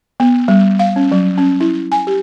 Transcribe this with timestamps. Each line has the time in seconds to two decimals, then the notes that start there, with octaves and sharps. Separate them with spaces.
0.20 B3
0.48 G3
0.79 F5
0.96 C#4
1.11 F#3
1.38 C#4
1.60 E4
1.92 G#5
2.07 G4